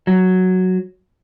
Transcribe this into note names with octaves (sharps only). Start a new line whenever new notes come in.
F#3